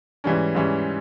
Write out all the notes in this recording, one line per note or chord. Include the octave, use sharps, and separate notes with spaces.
G#2 E3 G3 C#4
G#2 E3 G3 C#4